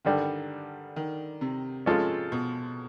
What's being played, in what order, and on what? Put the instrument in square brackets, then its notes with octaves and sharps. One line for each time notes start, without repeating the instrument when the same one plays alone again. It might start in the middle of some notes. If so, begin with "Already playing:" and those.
[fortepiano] G2 D3 G3 [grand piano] D#3
[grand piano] D#3
C3
[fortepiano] F3 G#3 C#4 F4 A4
[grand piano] B2